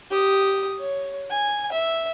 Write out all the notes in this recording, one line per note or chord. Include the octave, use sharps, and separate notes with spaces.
G4 D#6
C#5
G#5
E5